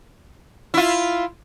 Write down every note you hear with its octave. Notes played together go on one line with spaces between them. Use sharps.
E4 F4